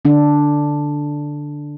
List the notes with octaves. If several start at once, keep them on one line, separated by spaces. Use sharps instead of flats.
D3 D4